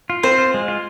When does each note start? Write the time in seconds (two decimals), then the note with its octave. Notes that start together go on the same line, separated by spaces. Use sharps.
0.10 F4
0.23 C4 C5
0.38 F4
0.54 G#3
0.68 F4